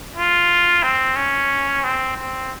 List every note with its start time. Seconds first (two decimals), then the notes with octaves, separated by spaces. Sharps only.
0.16 F4
0.83 C4
1.16 C#4
1.84 C4
2.17 C4